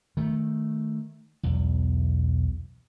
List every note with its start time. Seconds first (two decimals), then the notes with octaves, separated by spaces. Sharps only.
0.17 D#3 A3
1.43 B1 E2